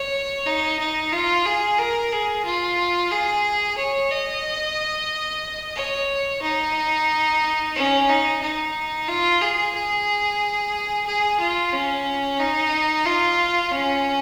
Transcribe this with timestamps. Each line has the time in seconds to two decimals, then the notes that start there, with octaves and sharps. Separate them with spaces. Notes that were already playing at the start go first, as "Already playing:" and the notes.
Already playing: C#5
0.46 D#4
0.79 D#4
1.12 F4
1.45 G#4
1.78 A#4
2.12 G#4
2.45 F4
3.11 G#4
3.78 C#5
4.11 D#5
5.76 C#5
6.42 D#4
7.75 C#4
8.09 D#4
8.42 D#4
9.08 F4
9.41 G#4
9.74 G#4
11.07 G#4
11.40 F4
11.72 C#4
12.39 D#4
13.06 F4
13.72 C#4